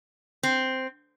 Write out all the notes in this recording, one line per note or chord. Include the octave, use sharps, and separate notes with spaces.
C4